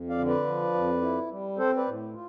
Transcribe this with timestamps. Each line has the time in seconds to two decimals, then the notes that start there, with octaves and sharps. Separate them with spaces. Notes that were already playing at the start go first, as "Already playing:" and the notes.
Already playing: F2
0.09 D5 F5
0.18 D3
0.28 B4 D5
0.46 F3
0.74 F2
1.02 E4
1.30 G3
1.58 C4 A4 C5
1.76 B4 D5
1.86 A2
2.14 F4